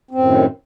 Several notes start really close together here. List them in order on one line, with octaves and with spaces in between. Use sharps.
C4 F#2 A2 D#3